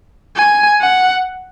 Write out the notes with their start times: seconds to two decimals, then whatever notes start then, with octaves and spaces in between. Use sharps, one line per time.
0.36 G#5
0.81 F#5